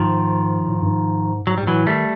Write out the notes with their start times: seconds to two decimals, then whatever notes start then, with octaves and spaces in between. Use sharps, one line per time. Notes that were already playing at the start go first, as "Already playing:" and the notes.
Already playing: G#2 D#3 F3
0.68 A2
0.75 G#2
0.82 G2
0.89 G#2
1.47 G#2 F#3
1.58 G3
1.63 G#2
1.67 A2 E3 F#3
1.86 D#3 G3 A3